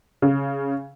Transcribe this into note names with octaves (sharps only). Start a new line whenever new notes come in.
C#3